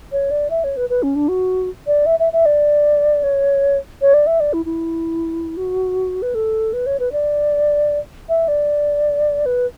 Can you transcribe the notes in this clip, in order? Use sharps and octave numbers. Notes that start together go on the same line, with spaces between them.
C#5
D5
E5
C#5
B4
B4
C#4
D4
F#4
D5
E5
E5
E5
D5
C#5
C#5
D5
E5
D5
E4
E4
F#4
B4
A4
B4
C#5
B4
D5
E5
D5
B4